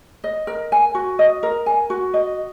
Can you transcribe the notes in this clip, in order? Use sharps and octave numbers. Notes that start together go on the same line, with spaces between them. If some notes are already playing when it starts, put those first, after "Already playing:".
D#5
A#4
G#5
F#4
D#5
A#4
G#5
F#4
D#5